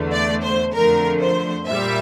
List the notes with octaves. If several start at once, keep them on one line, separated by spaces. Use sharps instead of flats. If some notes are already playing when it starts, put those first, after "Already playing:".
Already playing: E2 D3 A3
D5
C5
F2 D3 F3 A3 A#4
C5
A#2 G3 E5